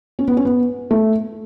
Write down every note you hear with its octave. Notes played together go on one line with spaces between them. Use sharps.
C#4
B3
C#4
B3
A3